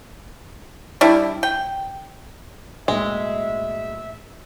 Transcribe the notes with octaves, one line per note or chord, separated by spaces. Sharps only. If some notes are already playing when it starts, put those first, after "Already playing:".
G3 D4 E4
G5
B1 A2 G#3 A#3 E5